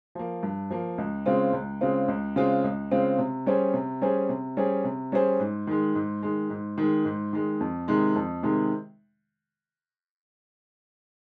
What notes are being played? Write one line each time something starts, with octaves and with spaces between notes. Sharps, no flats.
F3 A#3
G2
F3 A#3
C#2
C#3 G#3 C4 F4
C#2
C#3 G#3 C4 F4
C#2
C#3 G#3 C4 F4
C#2
C#3 G#3 C4 F4
C3
G3 C#4 G#4 C5
C3
G3 C#4 G#4 C5
C3
G3 C#4 G#4 C5
C3
G3 C#4 G#4 C5
G#2
D#3 G#3
G#2
D#3 G#3
G#2
D#3 G#3
G#2
D#3 G#3
F2
C3 D#3 G#3
F2
C3 D#3 G#3